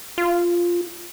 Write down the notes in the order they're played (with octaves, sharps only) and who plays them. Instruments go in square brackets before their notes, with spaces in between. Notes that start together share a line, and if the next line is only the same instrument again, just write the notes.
[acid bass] F4